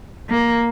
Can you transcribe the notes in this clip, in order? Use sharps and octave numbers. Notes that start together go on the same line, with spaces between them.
A#3